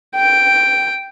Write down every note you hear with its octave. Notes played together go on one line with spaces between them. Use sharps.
G5